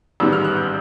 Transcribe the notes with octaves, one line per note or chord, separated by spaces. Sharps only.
A1 G#2 D#3 G3 E6
F6
F#6
G6